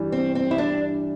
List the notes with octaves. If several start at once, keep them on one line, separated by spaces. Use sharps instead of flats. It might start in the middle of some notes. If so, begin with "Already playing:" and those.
Already playing: G2 E3 G3
C4
C4
E4
D4